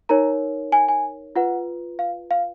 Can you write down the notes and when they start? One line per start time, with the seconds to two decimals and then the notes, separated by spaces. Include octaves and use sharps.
0.09 D#4 A#4 C#5 A#5
0.72 G#5
0.88 G#5
1.36 F4 B4 F#5
1.99 F5
2.31 F5